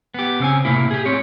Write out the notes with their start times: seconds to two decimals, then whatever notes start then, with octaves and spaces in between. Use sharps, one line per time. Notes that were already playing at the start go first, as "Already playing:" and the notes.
0.14 B3 G4
0.40 C#3 C4 G#5
0.65 A2 C3 F3 A#3 E4
0.91 G4 G#4
1.06 A2 C4 C#5